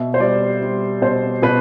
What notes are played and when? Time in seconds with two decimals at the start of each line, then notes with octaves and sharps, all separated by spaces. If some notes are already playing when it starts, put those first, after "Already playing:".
Already playing: B2 E5
0.14 C5
0.20 G3 D5
0.61 G3
1.02 B2 C5
1.42 B2 B4